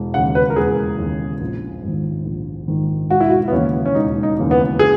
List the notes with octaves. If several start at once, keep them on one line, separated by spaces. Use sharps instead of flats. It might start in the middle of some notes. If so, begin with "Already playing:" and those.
Already playing: E1
D#2 C#3 F#5
B4
A#4
E1 G#4
D#2 C#3
A#1
G#2 D#3
A#1
G#2 D#3
E1 F#4
E4
F#4
B3
D#2 C#3 E3 A#3 C#4
C#4
E1 D#4
D#4
D#2 C#3 E3 A#3
B3
G#4